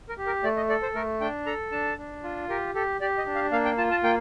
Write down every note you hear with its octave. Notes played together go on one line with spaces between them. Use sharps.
A#4
G4
A#4
A3 D5
D#5
A4 D5
C5
A3 A#4
D4 G5
A4 A#5
D4 A5
D4
F4
G4 A#4
G4 A4
G4 D5
D#5
D4
F5
A#3 F5
G5
F4 A5
A5
A#3 G5